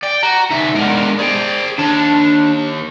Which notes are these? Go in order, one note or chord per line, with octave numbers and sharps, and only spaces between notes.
D5 G5
F#4 A#5
D3 A3 D#4 E5
G#3 B3 D4 A#4
G#4 C5 D5 G5
D#2 D4 A5